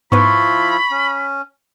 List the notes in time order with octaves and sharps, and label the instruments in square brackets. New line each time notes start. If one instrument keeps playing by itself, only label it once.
[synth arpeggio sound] G#2 B3 B4 [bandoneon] F3 E4 F4 [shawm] B5 [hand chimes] C#6
[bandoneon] C#4